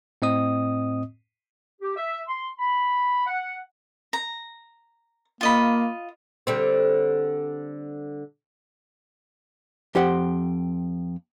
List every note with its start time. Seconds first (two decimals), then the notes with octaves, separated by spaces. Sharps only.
0.22 A2 C4 D#5 D#6
1.81 G4
1.96 E5
2.28 C6
2.59 B5
3.26 F#5
4.13 A#5
5.41 A#3 F4 D#5 B5
6.47 D3 G3 C4
9.95 F2 G4 C5 F#5